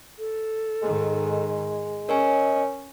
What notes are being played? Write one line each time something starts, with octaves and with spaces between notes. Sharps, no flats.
A4
G#2 D#3 G#3
C#4 A#4 C#5 D#5 G#5